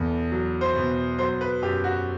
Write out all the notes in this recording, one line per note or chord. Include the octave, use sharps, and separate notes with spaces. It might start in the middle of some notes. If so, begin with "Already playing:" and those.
Already playing: E2 B2 A4
F#3
C5
B2
F#3 C5
B4
F#2 G4
F#4